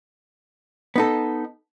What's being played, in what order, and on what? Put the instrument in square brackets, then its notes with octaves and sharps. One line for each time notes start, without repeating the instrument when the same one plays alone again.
[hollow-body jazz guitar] B3 D#4 A4